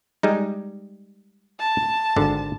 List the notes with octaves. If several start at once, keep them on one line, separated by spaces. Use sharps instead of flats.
G3 G#3 D#4
A5
G#1 G#2 D3